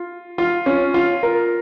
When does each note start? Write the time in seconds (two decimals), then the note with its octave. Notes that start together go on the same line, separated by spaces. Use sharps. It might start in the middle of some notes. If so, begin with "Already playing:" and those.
Already playing: F4
0.38 F4
0.66 C#4
0.94 F4
1.23 A#4